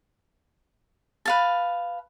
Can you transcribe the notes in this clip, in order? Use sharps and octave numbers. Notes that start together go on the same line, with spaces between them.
B4 F5 A5